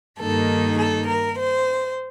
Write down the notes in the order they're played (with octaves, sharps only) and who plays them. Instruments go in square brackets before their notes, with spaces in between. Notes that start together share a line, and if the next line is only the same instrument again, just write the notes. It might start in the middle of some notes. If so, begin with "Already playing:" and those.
[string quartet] G2 D#3 A#3 D#4 A4
A4
A#4
C5